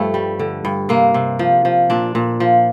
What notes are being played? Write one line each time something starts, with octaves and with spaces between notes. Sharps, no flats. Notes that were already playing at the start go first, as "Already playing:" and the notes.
Already playing: G2 F3 A3
G3
D3
G2
C3 A#3
C3
F3
F3
A#2 D4
A#2
F3